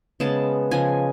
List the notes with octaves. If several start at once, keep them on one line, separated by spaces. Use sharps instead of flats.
C#3 G#3 B3 A5
C#3 F3 G#3 G#5